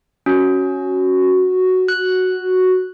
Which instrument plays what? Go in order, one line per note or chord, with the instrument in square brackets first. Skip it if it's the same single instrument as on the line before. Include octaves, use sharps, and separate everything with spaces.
[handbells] C#4 [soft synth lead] F#4
[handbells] F#6